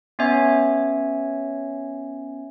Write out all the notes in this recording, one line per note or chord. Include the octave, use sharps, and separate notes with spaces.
B3 C#4 C#5 E5 G#5